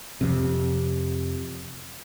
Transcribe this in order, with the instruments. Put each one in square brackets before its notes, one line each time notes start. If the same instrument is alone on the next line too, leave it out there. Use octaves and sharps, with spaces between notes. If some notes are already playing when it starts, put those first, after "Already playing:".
[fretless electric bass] F2 C3